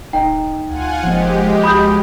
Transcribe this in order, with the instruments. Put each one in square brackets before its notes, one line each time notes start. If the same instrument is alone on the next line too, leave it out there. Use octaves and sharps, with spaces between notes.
[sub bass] D1 [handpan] D#4 [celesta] G5
[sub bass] D2 [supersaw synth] F4 F#5 G#5
[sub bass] F#1 [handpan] F3 A#3 C4 [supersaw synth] G#3 G4
[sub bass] C2 [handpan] F#4 [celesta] B5 D#6 G6